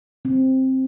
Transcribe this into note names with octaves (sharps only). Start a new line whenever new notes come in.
C4